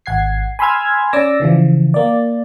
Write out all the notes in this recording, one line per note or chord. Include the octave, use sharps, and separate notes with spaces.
G#1 F#5 G#6 C7
G#5 B5 C6 E6 F6 G#6
C#4 D5 D6 E6 A#6
C#3 E3 F3
A#3 D5